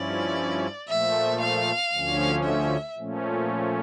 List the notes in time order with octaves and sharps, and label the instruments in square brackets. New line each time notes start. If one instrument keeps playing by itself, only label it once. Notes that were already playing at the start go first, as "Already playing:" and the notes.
Already playing: [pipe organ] G2 F3 C#4 E4 [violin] D5
[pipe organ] A#2 F3 A3 [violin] E5
[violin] F5
[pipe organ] D2 D3 F3 C#4
[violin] E5
[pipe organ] A#2 F3 A3 C#4